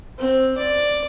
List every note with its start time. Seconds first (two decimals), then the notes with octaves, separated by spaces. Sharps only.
0.18 C4
0.57 D5